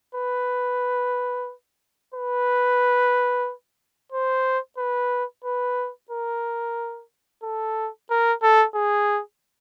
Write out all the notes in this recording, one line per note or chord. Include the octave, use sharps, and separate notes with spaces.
B4
B4
C5
B4
B4
A#4
A4
A#4
A4
G#4